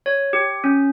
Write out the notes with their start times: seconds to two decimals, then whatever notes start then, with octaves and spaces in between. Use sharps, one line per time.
0.06 C#5
0.33 G4
0.64 C#4